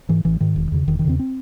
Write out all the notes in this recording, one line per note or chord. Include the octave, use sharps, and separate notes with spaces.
G#2 E3
A1 E3
G#2 D#3
E1
E2 C#3
E1 D#3
D#3
E2 C#3 C4
C4